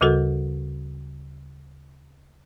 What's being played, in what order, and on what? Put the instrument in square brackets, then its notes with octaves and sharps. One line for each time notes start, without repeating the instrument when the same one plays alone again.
[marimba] D2 C#3 G3 F#4 A4 A#4